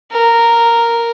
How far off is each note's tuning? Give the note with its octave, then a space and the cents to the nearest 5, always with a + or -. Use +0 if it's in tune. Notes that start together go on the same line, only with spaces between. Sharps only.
A#4 -5